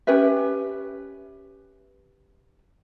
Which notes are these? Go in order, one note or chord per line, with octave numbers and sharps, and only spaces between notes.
C#4 G4 B4 E5